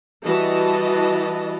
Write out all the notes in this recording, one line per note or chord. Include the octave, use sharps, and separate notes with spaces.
E3 G3 F#4 D#5 A5